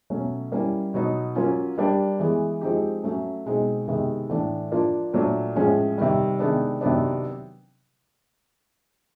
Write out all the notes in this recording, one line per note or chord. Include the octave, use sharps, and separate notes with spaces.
B2 F#3 A3 C#4
G3 A#3 C#4 E4
B2 F#3 B3 D#4
F#3 A#3 C#4 F4
G3 A#3 D4 G4
E3 G#3 B3
F3 G#3 C4 D#4 G4
F#3 A3 C#4
B2 G#3 C4 D#4
C3 D#3 G#3 B3
A2 E3 A3 D4
F3 A#3 D4 F4
A#2 F#3 A3 D4
A2 F3 G#3 C#4
C3 D#3 G3
C3 D#3 G#3 B3 D4
C3 D#3 F#3 B3 D4